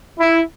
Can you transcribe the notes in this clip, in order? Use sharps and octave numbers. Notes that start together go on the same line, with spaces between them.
E4